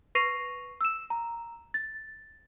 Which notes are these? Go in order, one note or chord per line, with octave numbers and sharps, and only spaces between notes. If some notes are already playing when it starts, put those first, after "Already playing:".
B4 C#6 A#6 C7 D#7 F7
E6 E7
A#5
A6